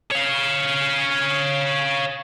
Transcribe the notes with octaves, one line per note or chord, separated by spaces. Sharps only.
C#5 F5